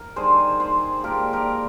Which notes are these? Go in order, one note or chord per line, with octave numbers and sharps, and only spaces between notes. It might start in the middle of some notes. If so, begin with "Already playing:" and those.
Already playing: A#4
D#3 G3 D4 G#4 C5
G#4 C5
A#2 G#3 D4 G4 A#4
G4 A#4